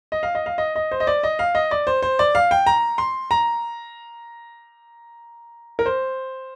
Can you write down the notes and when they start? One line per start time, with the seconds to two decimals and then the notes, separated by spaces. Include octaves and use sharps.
0.12 D#5
0.23 F5
0.35 D#5
0.46 F5
0.58 D#5
0.76 D#5
0.92 C5
1.00 D#5
1.07 D5
1.23 D#5
1.39 F5
1.55 D#5
1.71 D5
1.87 C5
2.02 C5
2.19 D5
2.35 F5
2.51 G5
2.66 A#5
2.98 C6
3.31 A#5
5.79 A#4
5.86 C5